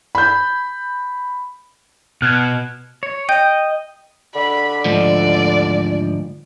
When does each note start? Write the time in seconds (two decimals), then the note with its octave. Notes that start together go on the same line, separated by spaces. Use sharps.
0.15 B5 G6
2.22 B2 F6 F#6 G#6
3.03 C#5
3.29 D#5 G5 G6
4.35 D3 B5
4.85 D2 G#2 F3 D5